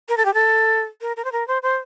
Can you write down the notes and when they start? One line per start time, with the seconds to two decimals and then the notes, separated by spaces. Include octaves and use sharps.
0.09 A#4
0.17 A4
0.25 G4
0.34 A4
1.01 A#4
1.16 A#4
1.24 C5
1.32 A#4
1.47 C5
1.62 C5